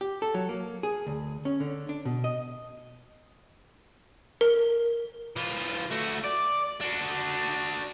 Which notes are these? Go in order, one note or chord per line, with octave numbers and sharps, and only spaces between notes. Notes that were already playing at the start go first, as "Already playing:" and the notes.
G4
A4
F#3
A#3
G#4
D2
C#4
D3
D4
B2
D#5
A#4
E3 F4
A3 F#4
D5
D4 F#4